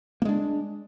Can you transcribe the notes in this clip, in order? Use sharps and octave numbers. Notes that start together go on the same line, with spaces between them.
G#3 A#3 D4